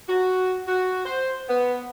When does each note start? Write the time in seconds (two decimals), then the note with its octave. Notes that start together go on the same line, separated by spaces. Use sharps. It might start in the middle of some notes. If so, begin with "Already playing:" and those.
0.08 F#4
0.67 F#4
1.05 C5
1.49 B3